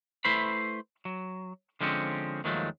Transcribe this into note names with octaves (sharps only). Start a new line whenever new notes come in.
A3 E4 B4 C5 B5
F#3
D3 F3 G#3 C4 C#4
D#2 D#3 F3 F#3 G#3 A3